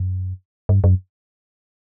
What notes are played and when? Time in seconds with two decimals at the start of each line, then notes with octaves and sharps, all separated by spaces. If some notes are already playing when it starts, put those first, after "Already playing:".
Already playing: F#2
0.69 G2
0.84 F#2